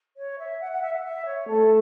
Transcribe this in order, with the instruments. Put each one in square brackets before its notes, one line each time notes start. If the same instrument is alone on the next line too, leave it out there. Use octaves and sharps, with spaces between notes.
[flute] C#5
E5
F#5
F#5
E5
F#5
E5
C#5
[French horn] A3 [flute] A4